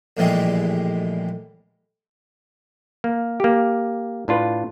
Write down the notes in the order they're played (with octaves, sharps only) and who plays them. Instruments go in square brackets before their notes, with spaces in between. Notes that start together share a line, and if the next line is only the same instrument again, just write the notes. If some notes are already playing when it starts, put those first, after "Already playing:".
[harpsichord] A#1 A2 D3 E3 G3 G#3
[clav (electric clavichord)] A#3
A#3 G4
A2 D4 F4 B4